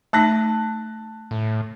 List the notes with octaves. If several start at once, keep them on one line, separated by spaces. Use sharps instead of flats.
A3 D#4 A5 F#6 A#6
A2